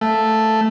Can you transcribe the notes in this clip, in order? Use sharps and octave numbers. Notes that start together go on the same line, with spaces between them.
A3